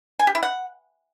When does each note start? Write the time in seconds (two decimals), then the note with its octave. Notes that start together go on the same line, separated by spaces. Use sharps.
0.19 G#5
0.27 G4
0.35 E4
0.43 F#5